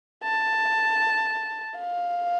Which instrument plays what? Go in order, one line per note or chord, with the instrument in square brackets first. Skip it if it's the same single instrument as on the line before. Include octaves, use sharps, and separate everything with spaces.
[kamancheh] A5
F5